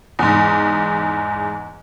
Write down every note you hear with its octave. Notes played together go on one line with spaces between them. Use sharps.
E2 G#2